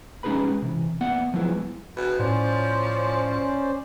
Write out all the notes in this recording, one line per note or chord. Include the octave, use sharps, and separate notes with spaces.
G#3 C#4 D#4 G#4 B4 B5
C3 E3
A#3 B3 D5 E5 F#5
F3 F#3 G#3 B3 E4 B4
B2
A2 F3 C#4 C5 D5